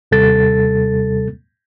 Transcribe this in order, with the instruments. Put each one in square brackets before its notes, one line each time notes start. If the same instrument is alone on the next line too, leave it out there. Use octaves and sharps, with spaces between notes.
[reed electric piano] D#2 C3 G3 A4 A6